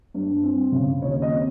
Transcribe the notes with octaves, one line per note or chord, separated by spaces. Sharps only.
G2
C4
C#3
D#2 C#5
D#5
C4